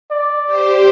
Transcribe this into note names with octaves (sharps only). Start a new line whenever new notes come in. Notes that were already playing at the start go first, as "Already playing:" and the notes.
D5
G4 C5